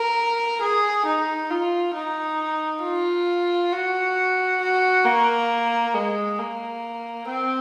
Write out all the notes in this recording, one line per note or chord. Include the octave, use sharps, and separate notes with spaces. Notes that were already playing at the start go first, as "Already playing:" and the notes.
Already playing: A#4
G#4
D#4
F4
D#4
F4
F#4
F#4
A#3
G#3
A#3
C4